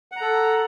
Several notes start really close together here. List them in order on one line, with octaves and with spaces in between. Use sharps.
F#5 A#5 A4